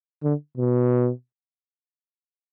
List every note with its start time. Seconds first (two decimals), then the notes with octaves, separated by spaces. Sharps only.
0.23 D3
0.58 B2